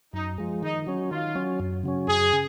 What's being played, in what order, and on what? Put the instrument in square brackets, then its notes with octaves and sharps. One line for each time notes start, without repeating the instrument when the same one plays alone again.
[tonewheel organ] F#2 [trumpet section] D#4
[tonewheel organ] F3 G#3
[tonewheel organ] D#3 [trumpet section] D#4
[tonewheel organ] F#3 C#4
[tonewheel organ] D#3 [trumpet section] F4
[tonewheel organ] F#3 C#4
F#2
C#3 F#3 C#4
[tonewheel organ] F#2 [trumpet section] G#4
[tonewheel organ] C#3